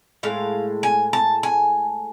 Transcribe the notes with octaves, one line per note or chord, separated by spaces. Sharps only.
A2 G#3 F5
G#5
A5
G#5